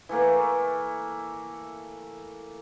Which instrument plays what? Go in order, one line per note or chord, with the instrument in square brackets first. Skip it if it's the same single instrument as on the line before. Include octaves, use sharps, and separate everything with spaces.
[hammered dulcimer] E3 A3 A#3